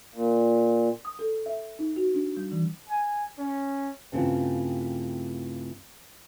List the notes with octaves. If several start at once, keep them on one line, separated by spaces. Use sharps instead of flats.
A#2
D#6
A4
E5
D#4
F#4
D4
G3
E3
G#5
C#4
G2 C#3 A3 C4 E4 F4